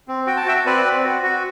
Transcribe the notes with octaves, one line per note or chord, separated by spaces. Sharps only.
C4
F#4 G5
A5
F#4 E5 G5
C4 B4 D5
C4
F#4
F#4